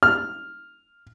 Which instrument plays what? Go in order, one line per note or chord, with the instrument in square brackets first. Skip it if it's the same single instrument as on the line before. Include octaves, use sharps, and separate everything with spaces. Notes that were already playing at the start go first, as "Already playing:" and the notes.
[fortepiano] F6